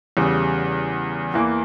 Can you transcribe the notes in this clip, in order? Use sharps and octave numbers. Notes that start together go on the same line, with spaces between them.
E2 C#3 G3
E2 E3 A#3